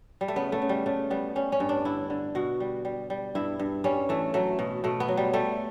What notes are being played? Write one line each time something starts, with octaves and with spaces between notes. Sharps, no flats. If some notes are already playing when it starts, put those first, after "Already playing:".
G3
A3
C#3 B3
A3
C#3
G3
C#3 A3
G3 B3
G3 C#4
C#4
G2
D4
D3 E4
D3
B2 F#4
G3
G3
G3
G2 E4
G2
G3 C#4
E3 A3
F#3 A3
B2
B2 A3
B3
F#3
G3
G3 A3